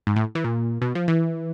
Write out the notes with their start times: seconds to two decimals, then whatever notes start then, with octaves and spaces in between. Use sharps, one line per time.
0.07 G#2
0.16 A2
0.35 E3
0.44 A#2
0.82 B2
0.95 F3
1.08 E3